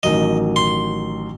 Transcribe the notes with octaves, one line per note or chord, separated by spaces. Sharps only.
A1 D#3 F#3 D#5
C6